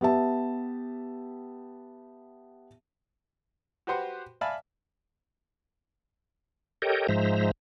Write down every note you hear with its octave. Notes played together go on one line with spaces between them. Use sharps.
B3 G4 E5 A5
F#4 G4 B4 C5 F#5 C6
D5 E5 F5 G#5 A5 B5
G4 A4 A#4 C#5 D#5 G5
G#2 F3 G#3 C5 E5 A#5